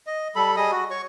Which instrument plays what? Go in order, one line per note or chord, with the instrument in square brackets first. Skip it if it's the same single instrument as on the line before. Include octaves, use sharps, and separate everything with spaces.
[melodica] D#5
G3 A4 B5
G3 G#4 D#5 D#6
F#4
C#5 C#6